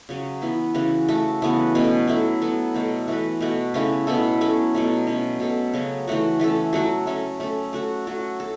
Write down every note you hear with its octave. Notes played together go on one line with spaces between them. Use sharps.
C#3 F#3 C#4
E3 B3 E4
C#3 E3 C#4 F#4
A3 F#4 A4
C#3 E3 B3 F#4
B2 A3 C#4
F#3 A3 E4 A4
F#3 B3 A4
B2 A3 F#4 A4
E3 A3 F#4 B4
B2 A3 F#4
C#3 A3 C#4 E4
B2 B3 E4 A4
F#3 C#4 A4
B2 F#3 A3
B2 F#3 C#4
B2 B3 A4
C#3 F#3 C#4
E3 A3 F#4
E3 A3 C#4 A4
F#3 A3 F#4 A4
A3 C#4 A4
A3 C#4 A4
A3 F#4 A4
F#3 C#4 F#4 A4
A4